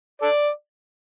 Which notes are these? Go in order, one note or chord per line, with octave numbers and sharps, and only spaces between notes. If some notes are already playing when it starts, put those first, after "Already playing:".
A4 D5